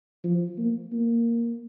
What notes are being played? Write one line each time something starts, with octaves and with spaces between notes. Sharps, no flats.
F3
A#3
A#3